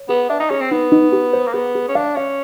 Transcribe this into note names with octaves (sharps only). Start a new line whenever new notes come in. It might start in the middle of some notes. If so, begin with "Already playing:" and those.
Already playing: C#5
B3 G#4
D4 E5
D#4
C#4 G#4
C4
B3 D#4
D#4
G4
C5
A#3
B3 G#4
G#4
C#4
D4 F5
C#4 F5